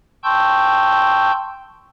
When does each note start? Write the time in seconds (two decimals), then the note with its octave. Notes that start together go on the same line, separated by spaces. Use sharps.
0.24 G5 A5 C6 C#6 E6 G6